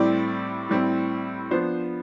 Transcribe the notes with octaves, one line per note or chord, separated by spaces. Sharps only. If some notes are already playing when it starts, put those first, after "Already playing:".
Already playing: A2 G3 C4 E4 D5
A2 G3 C4 E4
F3 B3 D4 C5